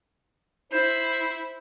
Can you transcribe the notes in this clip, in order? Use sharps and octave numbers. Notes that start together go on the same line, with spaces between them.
E4 C5